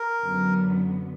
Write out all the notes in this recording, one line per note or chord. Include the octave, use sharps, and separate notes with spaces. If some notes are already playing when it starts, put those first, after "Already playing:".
Already playing: A#4
F#2 D3 F#3 B3